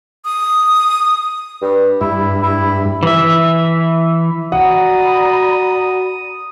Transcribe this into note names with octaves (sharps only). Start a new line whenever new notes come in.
D#6
G2
G2 E4
E4
E3 E5
F#4 D5 F#5 A#5 B5 D#6